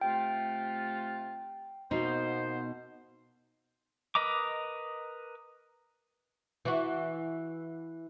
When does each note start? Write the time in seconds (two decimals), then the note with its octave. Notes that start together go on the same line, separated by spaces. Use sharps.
0.01 C3 A3 F4 G5
1.91 B2 A#3 B3 D#4 C5
4.15 A#4 B4 D#5 A#5 D6
6.65 E3 F#4